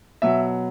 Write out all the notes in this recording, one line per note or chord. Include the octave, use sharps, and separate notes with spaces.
B2 F#3 E5